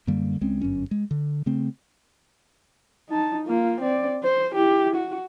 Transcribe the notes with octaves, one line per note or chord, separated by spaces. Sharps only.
F#2 D3 G3 A#3
C#2 G#3 C4 C#4
G1 F#2 C#4
G#3
D3
C#3 A3 C4
D#4 A5
A#3 F4
C4 D5
C5
E4 G4
F#4